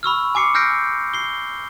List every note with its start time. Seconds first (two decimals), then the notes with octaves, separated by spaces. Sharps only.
0.03 B5 C#6 E6 F6
0.35 G#5 D6 C7 C#7
0.54 E6 F6 G6 A#6 C7 D7
1.14 C7 G7